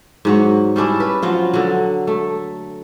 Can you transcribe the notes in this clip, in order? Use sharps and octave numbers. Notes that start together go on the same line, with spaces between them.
G#2 F#3 C#5
G3 C#4 D4 E4
B4
F3 F#3 F4
D3 F#3
A3